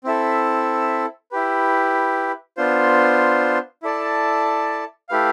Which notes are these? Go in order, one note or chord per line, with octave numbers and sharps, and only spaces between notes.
C4 E4 A4 E5
E4 G4 B4
B3 D4 F4 C5
E4 A4 D5 A5
A3 E4 G4 B4 F5